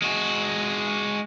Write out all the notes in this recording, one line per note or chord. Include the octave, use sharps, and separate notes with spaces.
G#3 F#4